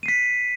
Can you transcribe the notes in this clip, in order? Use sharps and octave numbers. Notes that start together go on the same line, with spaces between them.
B6 C7 D#7